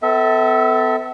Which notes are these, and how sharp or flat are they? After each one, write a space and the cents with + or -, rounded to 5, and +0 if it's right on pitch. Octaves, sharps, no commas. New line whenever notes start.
B3 +40 A4 +15 E5 -25